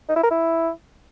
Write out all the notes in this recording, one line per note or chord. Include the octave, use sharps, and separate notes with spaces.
D#4
E4
A#4
E4